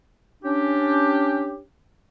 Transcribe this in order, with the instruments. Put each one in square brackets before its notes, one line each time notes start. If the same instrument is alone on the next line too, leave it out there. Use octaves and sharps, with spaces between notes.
[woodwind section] C#4 D4 G4